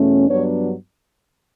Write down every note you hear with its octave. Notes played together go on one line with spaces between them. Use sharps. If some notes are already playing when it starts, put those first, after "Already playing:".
Already playing: E2 B2 A3 C#4
G2 F#3 B3 D4 C#5